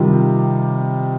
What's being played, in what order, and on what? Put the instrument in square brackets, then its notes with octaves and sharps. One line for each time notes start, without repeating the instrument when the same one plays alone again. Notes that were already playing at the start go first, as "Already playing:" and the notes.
Already playing: [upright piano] C3 D#3 G3 F4